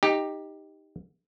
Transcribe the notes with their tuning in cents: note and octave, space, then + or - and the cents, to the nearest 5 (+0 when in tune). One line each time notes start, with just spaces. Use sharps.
D#4 +0 G4 +10